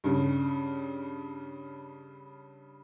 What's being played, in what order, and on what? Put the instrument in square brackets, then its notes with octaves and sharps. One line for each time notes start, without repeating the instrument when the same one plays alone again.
[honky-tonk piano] G2 C#3